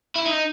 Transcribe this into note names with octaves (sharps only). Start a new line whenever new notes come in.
E4
D#4